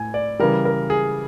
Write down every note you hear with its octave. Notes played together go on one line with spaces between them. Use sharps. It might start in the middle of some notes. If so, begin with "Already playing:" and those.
Already playing: A2 G#5
D5
C#3 E3 G3 A#4
A#4
G#4